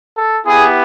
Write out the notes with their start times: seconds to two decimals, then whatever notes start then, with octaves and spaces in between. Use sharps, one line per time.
0.17 A4
0.45 B3 E4 G4 G#4